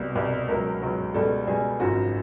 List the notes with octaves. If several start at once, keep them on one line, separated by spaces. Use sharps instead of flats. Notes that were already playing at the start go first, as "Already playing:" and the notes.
Already playing: C2 B2 G3
C2 B2 G3
C#2 B2 F#3 A#4
C#2 B2 F#3
C#2 B2 G3 A4
C#2 B2 G3 G#4
G#1 F#2 C#3 F3 F#4